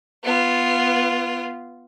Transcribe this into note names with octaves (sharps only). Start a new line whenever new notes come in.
B3 F4